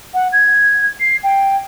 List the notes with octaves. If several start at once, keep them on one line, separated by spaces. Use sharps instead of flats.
F#5
G#6
C7
G5